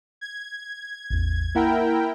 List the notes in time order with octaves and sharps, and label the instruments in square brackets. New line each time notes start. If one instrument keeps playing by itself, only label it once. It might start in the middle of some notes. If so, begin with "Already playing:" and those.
[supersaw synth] G#6
[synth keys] A1 E2
[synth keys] A#3 F#5 B5 [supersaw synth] E4 A#4 G5